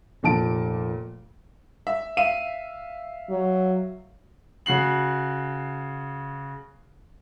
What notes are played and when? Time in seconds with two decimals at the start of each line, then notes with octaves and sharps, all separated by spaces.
0.23 F1 A#2 A5 D7
1.87 E5
2.17 E5 F5 D#7
3.30 F#3
4.66 C#3 F#4 C7 F#7